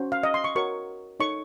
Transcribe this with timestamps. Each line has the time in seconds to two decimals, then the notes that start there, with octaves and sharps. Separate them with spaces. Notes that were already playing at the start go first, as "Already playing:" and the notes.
Already playing: C#4 F#4 C5
0.12 F5
0.23 D#5
0.34 C6
0.44 C#6
0.55 F#4 A#4 C#5 C#6
1.20 D#4 A4 C#5 C#6